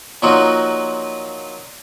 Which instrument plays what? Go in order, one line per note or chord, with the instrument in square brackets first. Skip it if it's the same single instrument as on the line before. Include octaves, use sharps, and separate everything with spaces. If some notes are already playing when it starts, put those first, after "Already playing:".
[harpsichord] A#2 F3 F#3 D#4 F4 F#4